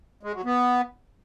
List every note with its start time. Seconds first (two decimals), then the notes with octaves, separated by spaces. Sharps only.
0.23 G#3
0.34 F#3
0.45 B3